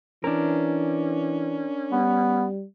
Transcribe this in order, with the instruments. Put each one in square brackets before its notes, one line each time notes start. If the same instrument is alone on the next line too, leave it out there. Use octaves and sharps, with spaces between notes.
[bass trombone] E3 [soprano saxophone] C#4 [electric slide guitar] D4 A#4
[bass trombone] G3 [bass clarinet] B3